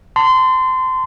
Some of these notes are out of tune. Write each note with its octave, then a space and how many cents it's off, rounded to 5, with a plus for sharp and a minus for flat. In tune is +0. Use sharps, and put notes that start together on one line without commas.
A5 +35 C6 -25